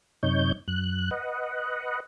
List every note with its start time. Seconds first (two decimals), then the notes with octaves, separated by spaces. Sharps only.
0.23 F#2 C3 D#4 C#5 G6
0.68 F#2 F#6
1.11 B4 D#5 F#5